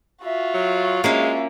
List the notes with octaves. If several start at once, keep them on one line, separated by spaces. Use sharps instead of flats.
F4 F#4 E5
F#3
G#3 A#3 C#4 E5 F5